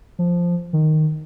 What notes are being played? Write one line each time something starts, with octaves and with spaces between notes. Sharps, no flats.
F3
D#3